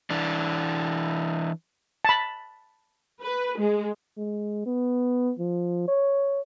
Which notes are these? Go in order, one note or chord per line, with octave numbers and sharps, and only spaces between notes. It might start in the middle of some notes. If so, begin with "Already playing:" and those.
E3 D4
A5 B5
B4
G#3
G#3
B3
F3
C#5